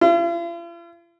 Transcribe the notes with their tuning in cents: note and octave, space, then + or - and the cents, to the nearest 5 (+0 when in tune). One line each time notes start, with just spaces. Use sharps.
F4 -45